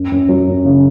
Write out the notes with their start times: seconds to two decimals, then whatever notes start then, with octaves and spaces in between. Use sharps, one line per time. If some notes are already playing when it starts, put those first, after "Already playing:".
Already playing: F#2
0.12 F#2
0.29 F#3
0.47 F#2
0.65 C#3